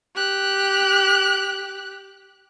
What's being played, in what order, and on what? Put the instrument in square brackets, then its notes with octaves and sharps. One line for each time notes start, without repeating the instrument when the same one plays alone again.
[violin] G4 F#6